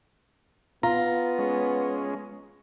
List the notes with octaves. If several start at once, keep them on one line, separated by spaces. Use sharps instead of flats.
B3 F4 A#5
G#3 C#4